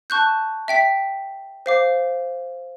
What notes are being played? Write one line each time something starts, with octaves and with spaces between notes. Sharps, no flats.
A5 C#6 F#6 G6
E5 G5 B6
C5 F5 D6